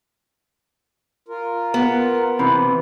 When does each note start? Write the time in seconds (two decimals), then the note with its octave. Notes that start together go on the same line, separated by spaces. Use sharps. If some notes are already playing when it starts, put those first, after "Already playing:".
1.28 F4 A#4
1.74 B3
2.39 C3 E3 B5